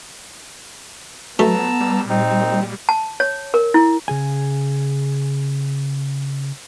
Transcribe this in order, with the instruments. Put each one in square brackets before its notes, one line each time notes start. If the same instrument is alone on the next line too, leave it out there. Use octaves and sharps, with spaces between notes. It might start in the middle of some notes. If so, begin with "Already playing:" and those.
[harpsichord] B2 A3 [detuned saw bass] F#3 [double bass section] B3 [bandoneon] A5 A#5 E6
[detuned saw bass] G3
[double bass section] A#2 [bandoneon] C4 D#4
[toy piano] A5
C#5
A#4
E4
[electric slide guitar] C#3 G#4 G#5